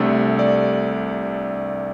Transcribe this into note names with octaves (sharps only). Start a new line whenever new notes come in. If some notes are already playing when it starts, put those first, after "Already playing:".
Already playing: C2 C3 A3 D4 A4
D5